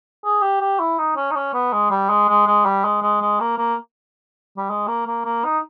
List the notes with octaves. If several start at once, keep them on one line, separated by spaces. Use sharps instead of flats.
G#4
G4
G4
E4
D#4
C#4
D#4
C#4
B3
G#3
G3
G#3
G#3
G#3
G3
G#3
G#3
G#3
A#3
A#3
G3
G#3
A#3
A#3
A#3
D#4